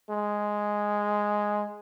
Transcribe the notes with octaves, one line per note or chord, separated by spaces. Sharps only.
G#3